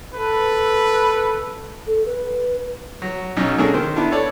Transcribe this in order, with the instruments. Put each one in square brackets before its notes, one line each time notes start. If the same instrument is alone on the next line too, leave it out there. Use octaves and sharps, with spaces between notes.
[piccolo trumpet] A4 [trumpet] B4
[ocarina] A4
B4
[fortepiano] F#3
B1 F#3 C#4 D#4
A#3 C#4 D4 G#4 A4
D#3 C5
B3 D4 E4
A4 C#5 D5